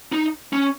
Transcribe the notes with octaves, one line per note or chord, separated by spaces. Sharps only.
D#4
C#4